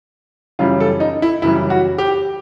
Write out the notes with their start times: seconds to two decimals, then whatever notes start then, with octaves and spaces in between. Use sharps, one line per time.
0.59 F#2 C#3 E3 G3 F4
0.80 A4
1.00 D#4
1.22 E4
1.42 F#2 C#3 E3 G3 E4
1.70 F#4
1.98 G4